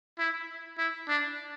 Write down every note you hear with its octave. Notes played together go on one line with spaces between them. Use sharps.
E4
E4
D4